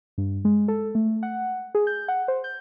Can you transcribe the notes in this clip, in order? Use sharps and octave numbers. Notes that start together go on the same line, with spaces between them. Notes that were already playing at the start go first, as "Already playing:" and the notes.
G2
G#3
A4
A3
F#5
G#4
G6
F#5
C5
G6